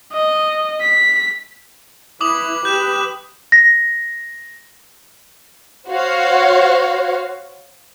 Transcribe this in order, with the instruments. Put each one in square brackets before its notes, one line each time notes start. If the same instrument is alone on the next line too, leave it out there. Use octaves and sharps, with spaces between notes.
[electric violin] D#5
B6
[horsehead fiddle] E4 B4 [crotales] D6 D#6 F#7
[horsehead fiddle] G4 B4 [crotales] G6 E7
[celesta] A#6
[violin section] F#4 C5 C#5 F5